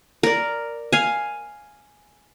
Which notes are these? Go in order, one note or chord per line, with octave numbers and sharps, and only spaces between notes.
A#4 D5
F5 G#5